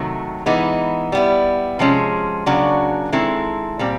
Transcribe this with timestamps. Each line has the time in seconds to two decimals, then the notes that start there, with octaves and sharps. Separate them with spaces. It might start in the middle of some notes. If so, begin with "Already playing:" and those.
Already playing: C3 D#3 F#3 A3
0.46 E3 G#3 B3 D#4
1.12 G3 B3 E4
1.79 C3 F3 G#3 C#4
2.46 C#3 F#3 A#3 D4 F#4
3.12 D#3 G#3 C4 E4 A4
3.79 A#2 G3 C4